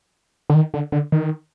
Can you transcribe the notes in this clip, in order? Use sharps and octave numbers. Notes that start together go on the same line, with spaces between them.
D3
D#3
D3
D3
D#3